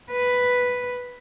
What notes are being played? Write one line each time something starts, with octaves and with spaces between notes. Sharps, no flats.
B4